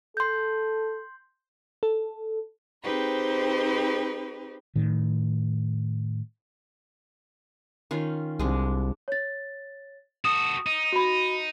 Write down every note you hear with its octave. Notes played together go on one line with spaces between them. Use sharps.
A4 C6 G6
A4
C4 D#4 G4 G#4 B4 C5
A2 D#3
D#3 C#4 F4
C2 G#3 D4
C#5 A6
F#4 A4 D#6
D#4
F#4 B5